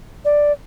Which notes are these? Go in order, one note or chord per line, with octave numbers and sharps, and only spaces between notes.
D5